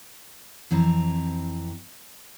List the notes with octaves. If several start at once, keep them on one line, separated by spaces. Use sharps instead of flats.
F2 E3 C4 A#5